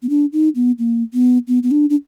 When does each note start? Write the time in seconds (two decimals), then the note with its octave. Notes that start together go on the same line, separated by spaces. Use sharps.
0.03 B3
0.09 D4
0.33 D#4
0.55 B3
0.79 A#3
1.13 B3
1.48 B3
1.63 B3
1.71 D4
1.90 D4